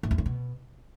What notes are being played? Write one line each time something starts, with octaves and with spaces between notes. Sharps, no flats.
A2
E2
A2
B2